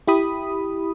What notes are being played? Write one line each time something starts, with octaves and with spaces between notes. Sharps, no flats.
E4 G4 B5 D#6